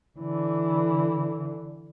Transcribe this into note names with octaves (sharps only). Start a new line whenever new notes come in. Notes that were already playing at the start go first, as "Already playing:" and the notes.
D3 E3